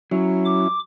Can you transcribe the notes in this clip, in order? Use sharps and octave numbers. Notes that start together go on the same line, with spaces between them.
F#3 C#4 E4
D6